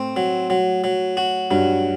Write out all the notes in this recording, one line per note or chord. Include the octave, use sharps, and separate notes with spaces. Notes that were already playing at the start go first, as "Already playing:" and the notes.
Already playing: A2 C4
F#3
F#3
F#3
F#4
G2 F#3